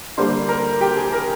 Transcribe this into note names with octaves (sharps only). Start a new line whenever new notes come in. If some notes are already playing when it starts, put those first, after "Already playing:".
D3 G3 A#3 C5 C6
A#4 A#5
G4 G5
G#4 G#5
A#4 A#5